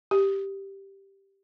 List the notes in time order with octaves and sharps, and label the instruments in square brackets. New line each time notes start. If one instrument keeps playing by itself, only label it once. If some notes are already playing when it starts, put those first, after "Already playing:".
[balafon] G4